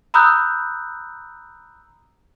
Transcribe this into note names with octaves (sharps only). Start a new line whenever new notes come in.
A#5 B5 D#6 E6 F#6 G6